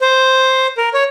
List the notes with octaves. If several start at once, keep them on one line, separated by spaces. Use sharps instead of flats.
C5
A#4
C#5